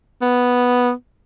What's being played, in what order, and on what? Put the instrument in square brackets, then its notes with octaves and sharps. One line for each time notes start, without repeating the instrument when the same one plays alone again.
[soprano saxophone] B3